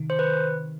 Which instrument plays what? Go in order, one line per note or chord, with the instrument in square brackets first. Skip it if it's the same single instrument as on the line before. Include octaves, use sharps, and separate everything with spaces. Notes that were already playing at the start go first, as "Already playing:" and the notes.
Already playing: [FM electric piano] C3 D#3
[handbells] C5
B4